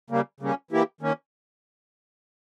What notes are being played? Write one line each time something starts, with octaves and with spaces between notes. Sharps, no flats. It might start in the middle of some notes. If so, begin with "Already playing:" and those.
C#3 G3 A#3
C#3 G3 A#3 C#4
E3 A#3 E4 G4
D#3 A#3 C#4